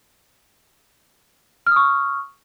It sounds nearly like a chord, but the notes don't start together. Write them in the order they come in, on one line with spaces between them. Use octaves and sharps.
F6 D#6 C#6